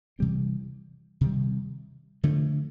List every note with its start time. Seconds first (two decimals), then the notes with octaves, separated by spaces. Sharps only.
0.19 C3 E3 G3 C4
1.21 C3 D#3 G3
2.23 D3 F3 A3